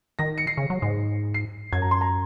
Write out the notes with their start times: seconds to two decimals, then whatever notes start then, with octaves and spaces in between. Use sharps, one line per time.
0.19 D#3 A#6
0.38 C#7
0.47 C7
0.57 C#3
0.70 F#3
0.82 G#2
1.34 C7
1.73 F#2 G#6
1.82 A#5
1.91 C6
2.01 A#5